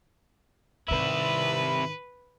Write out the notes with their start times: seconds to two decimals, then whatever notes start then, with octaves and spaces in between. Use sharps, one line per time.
0.88 G#2 C3 D#3 E4 B4